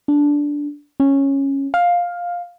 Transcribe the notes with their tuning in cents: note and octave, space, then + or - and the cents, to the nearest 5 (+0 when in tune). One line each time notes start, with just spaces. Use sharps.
D4 -10
C#4 -10
F5 +10